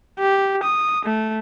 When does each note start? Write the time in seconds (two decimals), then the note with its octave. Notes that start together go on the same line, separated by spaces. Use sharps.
0.19 G4
0.63 D#6
1.05 A3